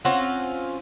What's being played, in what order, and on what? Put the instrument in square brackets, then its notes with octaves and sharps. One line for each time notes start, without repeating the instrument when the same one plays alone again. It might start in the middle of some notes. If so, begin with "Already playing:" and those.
[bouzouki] C4 C#4 F4 F#5